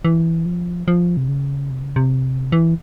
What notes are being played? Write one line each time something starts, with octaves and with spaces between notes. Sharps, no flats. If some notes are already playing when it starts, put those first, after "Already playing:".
E3
F3
F3
C3
C#3
C3
C#3
C3
E3